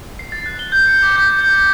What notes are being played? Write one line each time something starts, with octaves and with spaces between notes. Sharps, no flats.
C7
A6
F#6
G7
G6
C#7
D6
G6
G6
G6